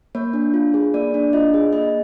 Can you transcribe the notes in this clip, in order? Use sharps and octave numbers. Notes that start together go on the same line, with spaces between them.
A#3 C#5
D4
F4
G#4
A#3 D5
D4
F4 D#5
G#4
A#3 D#5